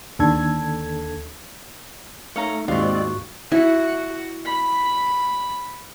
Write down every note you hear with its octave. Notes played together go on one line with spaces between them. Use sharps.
D#2 D3 A4 G#6
A3 D#4 C#5 F5 A#5
D#2 G#2 G#3 C4 F4 F#4 D5 C#6
E4 F#4
B5